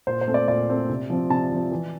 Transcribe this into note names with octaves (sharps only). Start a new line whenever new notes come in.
A#2 C5
C5
A3 C4
D5
A#2 D5
A3 C4
C3
F3 C4
C3 A5
F3 C4
E3